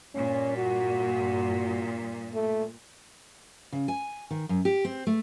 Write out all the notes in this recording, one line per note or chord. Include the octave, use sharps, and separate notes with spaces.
G2 A#2 C#4
F#4
A3
C#3
G#5
D#3
F#2
G4
C4
A3